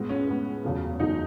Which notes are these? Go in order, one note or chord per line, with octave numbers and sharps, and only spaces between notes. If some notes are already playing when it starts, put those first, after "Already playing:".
Already playing: A2 G#3 B3
C#4
A2 G#3 B3
E2 C#3 F#3 A3
E2 C#3 F#3 A3 D#4